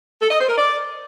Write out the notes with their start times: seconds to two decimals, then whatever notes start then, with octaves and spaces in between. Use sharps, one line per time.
0.21 A4
0.30 D#5
0.39 C5
0.48 A#4
0.57 D5